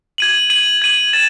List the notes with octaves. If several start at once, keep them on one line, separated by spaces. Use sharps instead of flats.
G#6 D#7 F#7
G#6 D#7 F#7
G#6 D#7 F#7
A6 E7